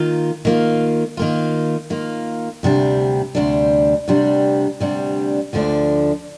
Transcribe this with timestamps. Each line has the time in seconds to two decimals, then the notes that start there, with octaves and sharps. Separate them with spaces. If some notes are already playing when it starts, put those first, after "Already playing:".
Already playing: D#3 A#3 F4
0.45 D#3 A#3 F4
1.17 D#3 A#3 F4
1.90 D#3 A#3 F4
2.63 D2 C3 G3 D4
3.35 D2 C3 G3 D4
4.08 D2 C3 G3 D4
4.80 D2 C3 G3 D4
5.53 D2 D3 F3 A3 D4